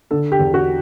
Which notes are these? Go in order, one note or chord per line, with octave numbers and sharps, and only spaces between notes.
D3 A4
G4
E2
F#4